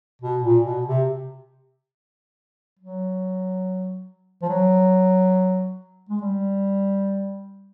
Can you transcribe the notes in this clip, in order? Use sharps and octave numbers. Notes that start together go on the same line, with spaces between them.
B2
A#2
B2
C3
F#3
F3
F#3
G#3
G3